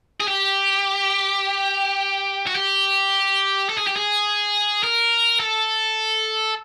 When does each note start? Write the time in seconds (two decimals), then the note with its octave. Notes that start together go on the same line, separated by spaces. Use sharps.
0.20 G#4
0.28 G4
2.47 F#4
2.55 G4
3.70 A4
3.78 G#4
3.87 G4
3.97 G#4
4.83 A#4
5.40 A4